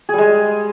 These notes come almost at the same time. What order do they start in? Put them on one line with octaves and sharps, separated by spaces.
G#4 G3 G#3